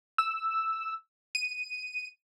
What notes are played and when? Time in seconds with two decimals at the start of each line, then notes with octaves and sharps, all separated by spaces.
0.18 E6
1.35 D#7